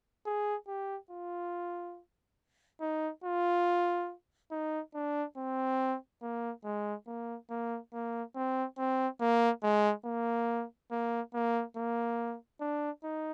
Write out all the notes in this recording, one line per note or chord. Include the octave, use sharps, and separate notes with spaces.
G#4
G4
F4
D#4
F4
D#4
D4
C4
A#3
G#3
A#3
A#3
A#3
C4
C4
A#3
G#3
A#3
A#3
A#3
A#3
D4
D#4